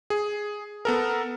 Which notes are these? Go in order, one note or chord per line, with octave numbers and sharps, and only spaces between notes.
G#4
B3 A4 A#4